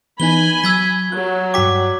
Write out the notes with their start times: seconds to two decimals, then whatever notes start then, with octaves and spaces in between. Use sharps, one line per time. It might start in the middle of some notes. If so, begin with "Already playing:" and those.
0.20 E3 B3 D#4 G#5 B5 G7
0.64 F#3 E6 G#6 B6
1.12 F#3 F#6
1.54 G2 F#4 G5 D6 B6